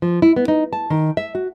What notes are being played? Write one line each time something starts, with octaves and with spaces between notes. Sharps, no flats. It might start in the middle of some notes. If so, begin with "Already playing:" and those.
F3
E4
B3
D#4
A5
D#3
E5
F#4